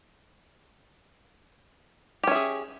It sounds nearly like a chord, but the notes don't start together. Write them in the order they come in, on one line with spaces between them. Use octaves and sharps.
G4 C#4 E5 G#4